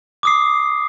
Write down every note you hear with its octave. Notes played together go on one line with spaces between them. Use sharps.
D6 D#6 C7